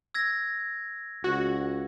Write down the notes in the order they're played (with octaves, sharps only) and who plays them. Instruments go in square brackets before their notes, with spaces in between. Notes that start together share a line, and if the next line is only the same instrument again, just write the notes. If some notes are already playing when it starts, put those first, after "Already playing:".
[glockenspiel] E6 G#6 A#6
[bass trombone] C#2 [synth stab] F#4